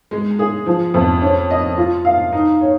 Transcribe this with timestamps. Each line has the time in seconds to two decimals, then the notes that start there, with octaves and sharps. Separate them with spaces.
0.11 G#3
0.39 G#4
0.66 F3
0.94 F2
1.22 C#4
1.50 D#5
1.77 F4
2.05 F5
2.32 D#4
2.61 C#5